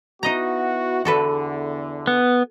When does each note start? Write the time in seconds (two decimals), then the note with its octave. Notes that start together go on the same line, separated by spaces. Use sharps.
0.23 B3 D#4 E4 F#4 D#5 A#5
1.05 E2 D3 F#4 A4 B4
2.07 B3